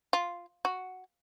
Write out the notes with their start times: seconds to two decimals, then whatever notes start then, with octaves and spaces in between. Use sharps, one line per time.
0.13 F4
0.65 F#4